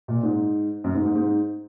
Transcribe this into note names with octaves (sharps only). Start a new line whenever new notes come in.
A#2
G#2
F#2
G#2
G#2
G#2